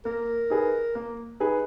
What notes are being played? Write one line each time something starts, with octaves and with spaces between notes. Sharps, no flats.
A#3 A#4
D#4 G#4 B4
A#3
D#4 G#4 B4